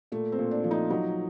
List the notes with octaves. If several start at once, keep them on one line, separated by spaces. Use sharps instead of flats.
A#2 A3
C4
A#2
D4
F3
D#4
F#3 D#4